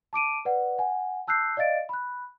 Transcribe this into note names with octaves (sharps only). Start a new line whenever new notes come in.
A5 D6 D7 D#7
B4 D5 F#5
F#5 G#5
A5 E6 F#6 G6 C7
D5 D#5 F5 A6 D7
B5 F#6